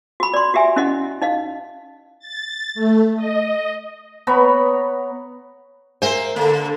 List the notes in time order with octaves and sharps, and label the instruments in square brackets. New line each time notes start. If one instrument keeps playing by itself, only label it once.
[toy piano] F#4 B5
D5 C6
F#4 G4 E5 G#5
C#4 E4 F#4 D#5 F#5
D#4 D#5 F5
[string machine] A6
A3
D#5
[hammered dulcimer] B3 C#5 A#5 B5
[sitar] A#3 C5 [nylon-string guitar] A#4 E5 G#5
[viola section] D3 [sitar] A#3